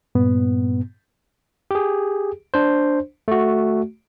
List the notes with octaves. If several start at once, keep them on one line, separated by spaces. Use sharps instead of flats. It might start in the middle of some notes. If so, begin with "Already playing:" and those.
G2 A#2 B3
G4 G#4
D4 C5
A3 F#4